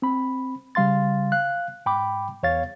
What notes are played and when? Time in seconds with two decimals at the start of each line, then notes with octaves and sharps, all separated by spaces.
0.02 C4 B5
0.75 C#3 G3 F5 C6 A6
1.32 F5 F#6
1.86 G#2 G5 B5 D6
2.43 E2 C#5 F5 A6